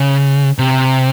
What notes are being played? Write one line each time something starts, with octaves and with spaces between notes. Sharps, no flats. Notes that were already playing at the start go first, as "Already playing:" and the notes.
Already playing: C#3
C3